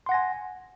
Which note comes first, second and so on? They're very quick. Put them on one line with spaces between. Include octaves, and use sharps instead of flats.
C6 F#5 A#6 G#5